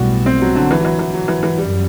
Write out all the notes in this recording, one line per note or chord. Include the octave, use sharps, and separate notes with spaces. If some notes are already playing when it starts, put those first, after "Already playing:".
Already playing: B1 A2 G3 B3 F#4
C4
F#3
D3
E3
F#3
E3
E3
F#3
E3
E3
F#2 G3